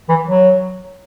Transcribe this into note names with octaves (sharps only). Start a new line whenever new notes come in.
E3
F#3